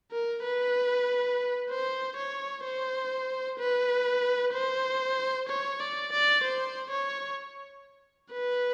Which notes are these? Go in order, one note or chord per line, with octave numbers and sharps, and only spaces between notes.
A#4
B4
C5
C#5
C5
B4
C5
C#5
D5
D5
C5
C#5
B4